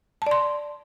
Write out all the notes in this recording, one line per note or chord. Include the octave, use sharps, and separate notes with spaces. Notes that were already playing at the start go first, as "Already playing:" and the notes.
D5 A5 C6